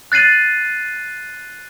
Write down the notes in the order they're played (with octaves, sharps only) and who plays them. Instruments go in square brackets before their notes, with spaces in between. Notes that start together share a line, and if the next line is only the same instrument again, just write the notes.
[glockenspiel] F#6 A6 C7 D#7 F#7